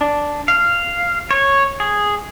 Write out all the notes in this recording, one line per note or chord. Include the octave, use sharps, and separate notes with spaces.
D4
F5
C#5
G#4